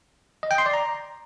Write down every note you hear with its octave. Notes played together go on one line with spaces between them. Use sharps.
D#5
G5
C6
D5
A#5